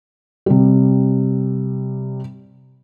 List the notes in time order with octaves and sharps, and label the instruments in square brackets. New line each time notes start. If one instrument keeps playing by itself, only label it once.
[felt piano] C3 G3